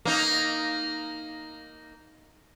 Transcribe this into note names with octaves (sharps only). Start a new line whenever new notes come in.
A#3 D#4